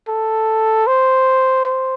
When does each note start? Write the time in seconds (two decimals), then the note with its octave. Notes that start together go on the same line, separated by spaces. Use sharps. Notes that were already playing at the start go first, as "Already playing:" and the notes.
0.08 A4
0.87 C5
1.65 C5